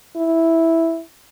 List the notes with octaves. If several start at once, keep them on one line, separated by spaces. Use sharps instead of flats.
E4